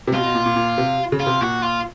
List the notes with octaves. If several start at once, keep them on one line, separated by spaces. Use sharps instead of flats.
C3
B2 F4
B2
A#2
A#2
A#2
C3
C#3
F4
C3
A#2 F#4
F4